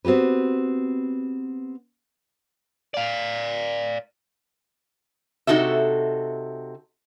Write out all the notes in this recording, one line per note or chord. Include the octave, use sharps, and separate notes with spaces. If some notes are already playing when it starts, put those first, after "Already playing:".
B3 C4 F#4 G4 B4
D5 F5
C3 D#4 F#4 A4 E5